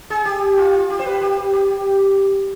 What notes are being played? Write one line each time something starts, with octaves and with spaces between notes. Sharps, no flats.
G#4
G4
F4
G4
C5
B4
G4
G4